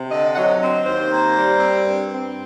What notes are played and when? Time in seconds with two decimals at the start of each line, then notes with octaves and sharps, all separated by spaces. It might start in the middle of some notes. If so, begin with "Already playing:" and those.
Already playing: C3
0.10 D3 D#5
0.32 F#5
0.35 F#3 D#5
0.60 C4 D#5
0.85 D#2 C5
1.11 A#3
1.35 G3
1.60 C4
1.86 G2
2.11 C4